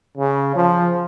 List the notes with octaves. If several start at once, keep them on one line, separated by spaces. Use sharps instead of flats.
C#3
F3